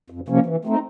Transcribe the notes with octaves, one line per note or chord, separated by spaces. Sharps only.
F2
C3 F3 A#3 C#4
E3
A3 C4 D#4